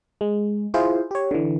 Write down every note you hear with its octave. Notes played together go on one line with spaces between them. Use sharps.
G#3
E4 F4 G#4 C5
G4 C#5
D3 E3